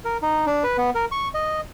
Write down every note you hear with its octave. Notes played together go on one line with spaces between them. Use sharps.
A#4
D#4
D4
B4
B3
A#4
C#6
D#5